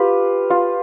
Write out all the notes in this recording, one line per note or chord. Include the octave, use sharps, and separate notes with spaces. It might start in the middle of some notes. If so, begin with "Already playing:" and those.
Already playing: F4 G4 B4
F4